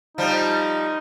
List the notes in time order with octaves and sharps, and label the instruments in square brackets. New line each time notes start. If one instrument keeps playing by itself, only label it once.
[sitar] F3 G3 [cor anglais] D#4